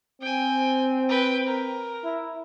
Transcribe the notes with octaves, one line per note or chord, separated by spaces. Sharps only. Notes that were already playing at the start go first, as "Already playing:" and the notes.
C4 G5 G#5
B4 G5
A#4
E4